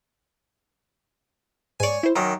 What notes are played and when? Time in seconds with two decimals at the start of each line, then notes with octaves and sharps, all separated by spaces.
1.80 G#2 C#5 D5 G#5
2.03 E4 C5
2.16 F#2 D#3 A#5